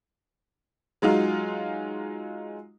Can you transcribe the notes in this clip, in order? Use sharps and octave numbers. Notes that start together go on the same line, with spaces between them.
F#3 G#3 D#4 F4